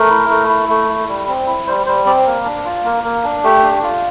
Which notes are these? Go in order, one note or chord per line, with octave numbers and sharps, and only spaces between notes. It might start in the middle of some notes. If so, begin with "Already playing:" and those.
Already playing: A3 A#4
E4
A3
E4
A3
E4
G3
C4
E4
G3 C5
G3 C5
C4 D5
A#3
D4
F4
A#3
A#3
D4
A3 G4
D4
F4